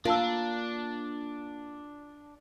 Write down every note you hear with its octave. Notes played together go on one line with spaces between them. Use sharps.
A#3 D4 F4 F5 A5 E6